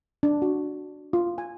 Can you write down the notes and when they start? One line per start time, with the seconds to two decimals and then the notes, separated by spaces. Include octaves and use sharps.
0.23 D4
0.42 F#4
1.13 F4
1.38 G#5